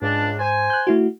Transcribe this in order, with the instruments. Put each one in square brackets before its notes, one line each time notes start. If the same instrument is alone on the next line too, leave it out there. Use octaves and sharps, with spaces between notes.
[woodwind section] C#2 D4 [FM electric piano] G#2
[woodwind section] C5 G#5
[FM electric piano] F#6 G6
A3 E4 F#4